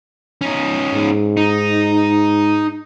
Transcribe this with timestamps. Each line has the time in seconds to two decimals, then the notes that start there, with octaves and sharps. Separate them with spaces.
0.41 C#4 D#4
0.94 G#2
1.37 D#4